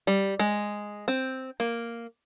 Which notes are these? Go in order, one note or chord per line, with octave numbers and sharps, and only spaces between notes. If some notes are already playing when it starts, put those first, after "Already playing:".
G3
G#3
C4
A#3